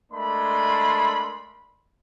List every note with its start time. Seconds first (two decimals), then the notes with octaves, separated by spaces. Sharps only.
0.12 G#3 A3 D4 A#4 B5 C6